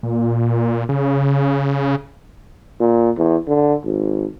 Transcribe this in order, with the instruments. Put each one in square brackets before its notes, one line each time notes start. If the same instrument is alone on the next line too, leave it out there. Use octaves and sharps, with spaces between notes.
[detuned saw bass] A#2
C#3
[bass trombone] A#2
E2
D3
G#1